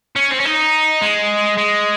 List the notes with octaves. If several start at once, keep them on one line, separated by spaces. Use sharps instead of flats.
C#4
C4
C#4
D#4
G#3
G#3